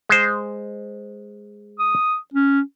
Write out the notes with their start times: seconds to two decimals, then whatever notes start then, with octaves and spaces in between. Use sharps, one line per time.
0.09 G#3 C5
1.79 D#6
2.33 C#4